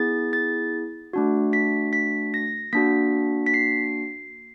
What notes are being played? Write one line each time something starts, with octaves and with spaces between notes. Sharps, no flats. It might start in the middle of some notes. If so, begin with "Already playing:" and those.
Already playing: B3 E4 G#4 A6
A6
A3 D4 F#4
B6
B6
A#6
A#3 D4 F#4 B6
B6
C7